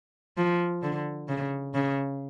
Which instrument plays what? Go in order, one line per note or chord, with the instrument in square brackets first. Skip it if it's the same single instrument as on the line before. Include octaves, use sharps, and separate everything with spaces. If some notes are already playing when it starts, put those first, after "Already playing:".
[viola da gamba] F3
D3
C#3
C#3